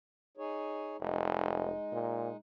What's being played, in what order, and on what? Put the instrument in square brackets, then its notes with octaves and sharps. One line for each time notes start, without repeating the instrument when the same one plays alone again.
[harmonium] D#4 G#4 C#5
[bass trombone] F1 [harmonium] G#3 D#4
[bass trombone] A#2